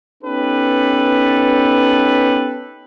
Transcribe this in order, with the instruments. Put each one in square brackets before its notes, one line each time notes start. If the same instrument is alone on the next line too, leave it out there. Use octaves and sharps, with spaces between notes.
[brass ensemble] B3 C#4 D#4 G4 A4 B4